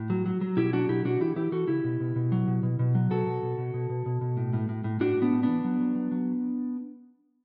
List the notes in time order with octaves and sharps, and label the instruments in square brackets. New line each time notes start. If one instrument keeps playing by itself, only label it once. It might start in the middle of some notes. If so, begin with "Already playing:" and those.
Already playing: [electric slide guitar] A2
F#3
F#3
F#3
B2 E4 G4
F#3 D4 F#4
B2 E4 G4
B2 D4 F#4
E3 E4 G4
E3 E4 G4
E3 F#4 A4
C#3 E4 G4
B2
B2
B2
F#3
B2
B2
B2
F#3
B2 F#4 A4
B2
B2
B2
B2
B2
B2
B2
A2
A2
A2
A2
A2 D4 F#4
A2
B3 D4
A2
B3 D4
E3
F#3
F#3
F#3
F#3